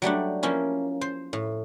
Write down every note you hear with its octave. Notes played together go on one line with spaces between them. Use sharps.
F#3 G3 A3 D4
F3 A#3 C#4 E4
C5
A2